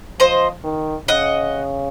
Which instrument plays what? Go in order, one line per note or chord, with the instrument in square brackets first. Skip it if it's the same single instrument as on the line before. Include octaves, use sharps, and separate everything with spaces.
[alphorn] F3 [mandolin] C5 D#5
[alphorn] D#3
[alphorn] C#3 [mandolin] D#5 F#5